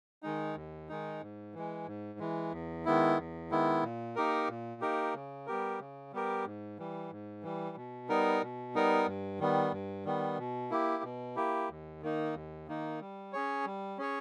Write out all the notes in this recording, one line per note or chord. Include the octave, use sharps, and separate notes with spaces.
D#3 G#3 D#4
D#2
D#3 G#3 D#4
G#2
E3 G#3
G#2
E3 G#3
E2
D#3 G#3 B3 E4
E2
D#3 G#3 B3 E4
A#2
A#3 D#4 G4 A#4
A#2
A#3 D#4 G4 A#4
C#3
G3 B3 G4 A#4
C#3
G3 B3 G4 A#4
G#2
E3 G3
G#2
E3 G3
B2
G3 B3 D#4 A#4
B2
G3 B3 D#4 A#4
G2
D#3 G3 B3
G2
D#3 G3 B3
B2
A#3 E4 G4
B2
A#3 E4 G4
D#2
D#3 A#3 D#4
D#2
D#3 A#3 D#4
G3
C#4 G#4 C#5
G3
C#4 G#4 C#5